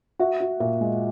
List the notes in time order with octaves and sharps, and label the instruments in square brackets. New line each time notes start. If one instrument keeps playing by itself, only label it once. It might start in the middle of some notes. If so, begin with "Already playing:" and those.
[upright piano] F#4 [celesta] E5
[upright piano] F#4
[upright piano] A#2 [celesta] E5
[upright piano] G#3